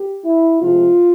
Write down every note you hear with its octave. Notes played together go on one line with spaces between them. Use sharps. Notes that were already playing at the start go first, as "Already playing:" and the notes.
Already playing: G4
E4
C3 F3 G#3 F4